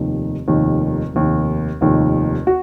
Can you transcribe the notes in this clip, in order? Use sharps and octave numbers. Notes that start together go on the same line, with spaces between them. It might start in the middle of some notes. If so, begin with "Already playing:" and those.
Already playing: F1 D#2 D#3
F1 D#2 D#3
F1 D#2 D#3
F1 D#2 D#3
F#4